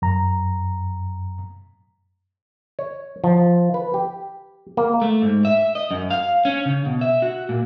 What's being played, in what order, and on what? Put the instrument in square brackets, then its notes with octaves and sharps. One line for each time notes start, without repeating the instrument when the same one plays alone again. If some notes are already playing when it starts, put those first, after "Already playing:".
[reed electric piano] F#2 A#5
[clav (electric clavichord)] C#5
F3
B4
G4
A#3
[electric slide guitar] A3
G#2
E5
D#5
F#2
F5
C#4
C#3
B2
E5
F#4
A#2